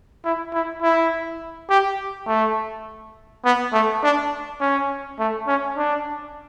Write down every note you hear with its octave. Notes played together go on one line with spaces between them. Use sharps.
E4
E4
E4
G4
A3
B3
A3
D4
C#4
A3
C#4
D4